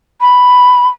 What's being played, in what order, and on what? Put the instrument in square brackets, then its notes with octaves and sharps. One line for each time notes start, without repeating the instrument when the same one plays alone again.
[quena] B5